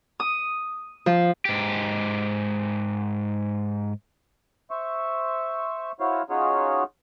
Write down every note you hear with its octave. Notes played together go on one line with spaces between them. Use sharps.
D#6
F3
G#2 G4
C5 E5 C#6
E4 F#4 C5 C#5 F5
C#4 D#4 F4 F#4 G#4 C#5